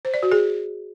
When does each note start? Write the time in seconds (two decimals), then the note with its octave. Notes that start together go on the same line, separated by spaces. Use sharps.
0.05 C5
0.14 D5
0.23 F#4
0.32 G#4